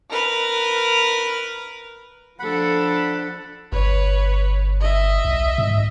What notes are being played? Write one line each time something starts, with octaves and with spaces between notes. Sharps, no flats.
A#4 B4
F3 D4 A4 F#5 B5
G1 B4 C#5
D#5 E5
B1
G#2